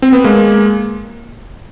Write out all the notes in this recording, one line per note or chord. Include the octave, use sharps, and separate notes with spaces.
C4
B3
G#3 A#3